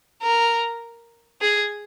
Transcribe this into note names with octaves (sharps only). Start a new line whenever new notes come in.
A#4
G#4